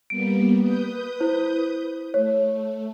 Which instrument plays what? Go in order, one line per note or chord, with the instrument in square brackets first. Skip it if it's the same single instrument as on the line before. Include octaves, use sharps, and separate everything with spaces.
[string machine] G3 A#3 B3 [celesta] D7
[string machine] B4 D#6 G6
[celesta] E4 C5
[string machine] A3 [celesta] C#5